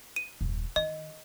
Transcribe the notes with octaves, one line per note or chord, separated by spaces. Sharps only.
D#7
D#1 F#2
D#3 D#5